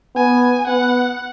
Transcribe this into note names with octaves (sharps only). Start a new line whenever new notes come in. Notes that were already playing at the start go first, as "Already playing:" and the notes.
B3 G#5
B3 F#5